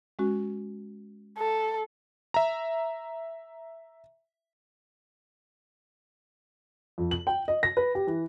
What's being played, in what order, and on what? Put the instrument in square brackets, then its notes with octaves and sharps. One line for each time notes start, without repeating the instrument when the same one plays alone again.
[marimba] G#3 C#4 F#4
[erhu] A4
[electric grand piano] E5 A#5
[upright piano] F2
F#7
G5
D#5
A#6
B4
G4
E3